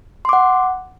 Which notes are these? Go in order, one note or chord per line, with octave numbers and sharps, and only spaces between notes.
F#5 C6 D6